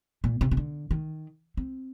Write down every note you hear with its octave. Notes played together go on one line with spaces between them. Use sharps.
A#2
C3
C3
D3
D#3
C4